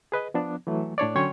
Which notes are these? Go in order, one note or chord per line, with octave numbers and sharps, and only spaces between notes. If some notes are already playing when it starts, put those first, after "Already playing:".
G#4 B4 D#5
F3 B3 D4
E3 F#3 A3
A2 D4 C#5 D5
D3 F#3 C#4 C#5 G5 C6